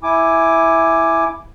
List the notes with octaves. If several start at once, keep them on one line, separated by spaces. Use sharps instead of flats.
E4 G#5 D6